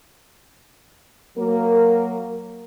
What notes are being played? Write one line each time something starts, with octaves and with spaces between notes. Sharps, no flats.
F#3 A#3 A#4